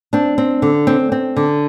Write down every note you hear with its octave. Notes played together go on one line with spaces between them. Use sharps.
C4 D4
C4
D3
C4
C4
D3